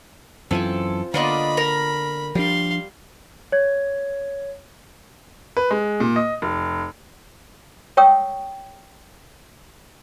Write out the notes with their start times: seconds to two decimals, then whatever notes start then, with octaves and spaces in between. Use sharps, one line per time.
0.51 F#2 E3 C4 F4 A4 G#5
1.14 D3 A#3 B3 F4 D5 D#5 A5 B5
1.57 A#4
2.35 F3 G3 D4 F5 C6
3.52 C#5 G#6
5.57 B4
5.71 G#3
6.00 A#2
6.16 D#5
6.42 F1
7.97 C#5 F5 G5 C#6 D#6 E6